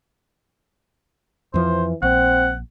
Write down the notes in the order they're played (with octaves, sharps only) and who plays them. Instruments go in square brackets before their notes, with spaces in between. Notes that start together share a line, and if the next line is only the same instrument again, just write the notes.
[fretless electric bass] F2 F3 [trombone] E3 [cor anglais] C5
[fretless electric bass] A#1 [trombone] C4 [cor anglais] F#5